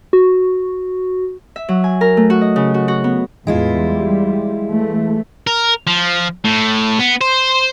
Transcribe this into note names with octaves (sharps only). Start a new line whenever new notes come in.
F#4
E5
F#3
G#5
A#4
A3
F#4
D#5
C#3
F#4
F#4
B3
E2 A2 G#3 E4 F4
G3
E3 A3
A#4
F3
A2
B3
C5